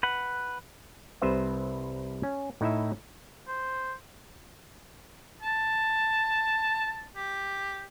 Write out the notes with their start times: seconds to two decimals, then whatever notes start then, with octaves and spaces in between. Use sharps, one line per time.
0.03 B4 F#5
1.22 C2 C3 B4 C5 E5
2.23 C#4
2.61 A2 D#4 E4 E5
3.48 C5
5.42 A5
7.16 G4